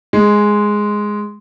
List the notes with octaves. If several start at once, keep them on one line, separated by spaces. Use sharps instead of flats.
G#3